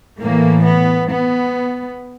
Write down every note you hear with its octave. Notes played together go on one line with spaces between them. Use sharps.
A2 E3 A#3
B3
B3